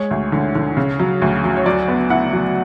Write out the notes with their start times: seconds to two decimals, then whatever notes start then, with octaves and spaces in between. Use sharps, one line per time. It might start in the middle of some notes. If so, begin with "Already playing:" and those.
Already playing: G#3 C#5
0.11 D2
0.32 D3
0.55 D3
0.77 C#3
1.00 F#3
1.22 D2
1.44 F#3
1.57 C#5
1.66 F#3 D5
1.88 B3
2.10 E4 F#5
2.33 F#3